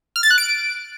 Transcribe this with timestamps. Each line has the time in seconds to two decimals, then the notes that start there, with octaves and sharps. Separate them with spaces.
0.16 F6
0.23 A6
0.30 F#6
0.38 D7